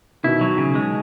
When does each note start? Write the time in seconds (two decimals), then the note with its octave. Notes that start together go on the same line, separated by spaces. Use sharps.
0.23 B2 D#3 E4
0.41 F#3
0.58 C#3
0.75 G#3